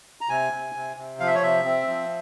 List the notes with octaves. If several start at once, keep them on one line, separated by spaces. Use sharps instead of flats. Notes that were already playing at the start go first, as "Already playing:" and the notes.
A#5
C3 G#5
C3
C3
C3
F3 F5
E5
C#5
C3 E5
C4
F3